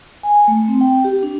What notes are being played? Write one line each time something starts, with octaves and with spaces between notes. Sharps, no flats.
G#5
A3
C4
G5
G4
D4